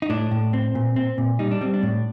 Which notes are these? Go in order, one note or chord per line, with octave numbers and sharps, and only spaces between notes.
D#4
A2 D4
A2
C4
A#2
C4
A#2
G3 D#4
D4
G3 C4
D4
A2